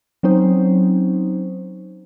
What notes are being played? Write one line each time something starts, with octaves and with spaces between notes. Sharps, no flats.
F#3 C4 C#4 D#4 C5